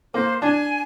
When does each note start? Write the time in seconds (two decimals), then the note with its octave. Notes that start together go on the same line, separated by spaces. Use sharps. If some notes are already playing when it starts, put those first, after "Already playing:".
0.14 A#3 C5
0.42 D4 G#5